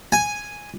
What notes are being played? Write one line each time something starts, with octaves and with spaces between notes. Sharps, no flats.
G#5